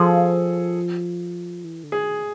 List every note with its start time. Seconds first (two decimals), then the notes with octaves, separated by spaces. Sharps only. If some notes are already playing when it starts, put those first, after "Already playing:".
Already playing: F3 G#4 A4
1.64 E3
1.83 D3
1.92 D#3 G#4